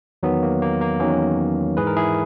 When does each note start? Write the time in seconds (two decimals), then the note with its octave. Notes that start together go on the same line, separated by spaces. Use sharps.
0.23 E2 D#3 F#3 B3
0.43 A#3
0.62 A#3
0.81 A#3
1.00 E2 D#3 F#3 A#3 C#4
1.77 G#2 E3 G#4 B4
1.87 A#4
1.96 E4 G#4